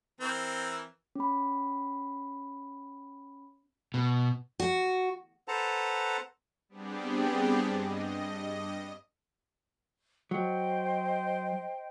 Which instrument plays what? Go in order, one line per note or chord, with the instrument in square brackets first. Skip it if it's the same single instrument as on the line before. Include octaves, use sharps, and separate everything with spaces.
[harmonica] E3 C4 A#4
[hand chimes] C#4 B5
[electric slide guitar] B2
[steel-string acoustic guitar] F#4
[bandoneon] A4 B4 C5 F#5 A5 A#5
[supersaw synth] G3 B3 C4 D4 G4 G#4
G2 D#5
[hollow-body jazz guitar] F#3 [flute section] C5 D#5 G5